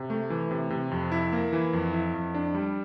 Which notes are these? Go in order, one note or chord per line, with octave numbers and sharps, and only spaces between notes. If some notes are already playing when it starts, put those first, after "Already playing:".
Already playing: C3
A3
E3
C3
C3
F2
E4
A#3
E3
F2
E4
F2
D4
G3